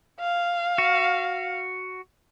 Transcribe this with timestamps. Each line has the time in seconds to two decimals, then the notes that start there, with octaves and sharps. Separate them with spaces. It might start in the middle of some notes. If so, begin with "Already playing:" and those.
0.20 F5
0.78 F#4